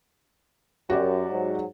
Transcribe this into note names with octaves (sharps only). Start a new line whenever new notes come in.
F#2 F#4 G4 D5
G#2 F#3